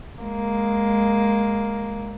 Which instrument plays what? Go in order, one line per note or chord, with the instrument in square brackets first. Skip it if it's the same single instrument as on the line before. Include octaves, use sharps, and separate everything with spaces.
[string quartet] G#3 A#3